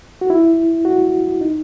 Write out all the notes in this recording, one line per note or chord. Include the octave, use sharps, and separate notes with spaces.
F#4
E4
F#4
D#4